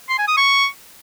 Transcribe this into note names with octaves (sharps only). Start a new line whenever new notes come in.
C6
G#5
D#6
C#6